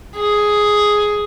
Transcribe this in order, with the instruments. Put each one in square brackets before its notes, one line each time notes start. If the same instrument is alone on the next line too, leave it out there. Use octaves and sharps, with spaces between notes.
[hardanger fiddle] G#4